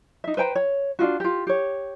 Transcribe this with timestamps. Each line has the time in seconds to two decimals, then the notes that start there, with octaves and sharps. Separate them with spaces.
0.24 D#4 E5
0.37 B4 C5 G5 A#5
0.55 C#5
0.99 D4 D#4 F4 F#4
1.20 F4 G4
1.47 G4 C#5